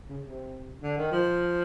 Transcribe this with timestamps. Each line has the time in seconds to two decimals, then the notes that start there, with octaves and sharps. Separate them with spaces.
0.09 C#3
0.24 C3
0.83 D3
0.98 D#3
1.11 F3